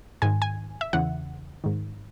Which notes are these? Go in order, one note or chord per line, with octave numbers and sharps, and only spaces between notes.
G#2 D#3 G#5
G#5
E5
E2 C#3 E3 F#5
G#2 D#3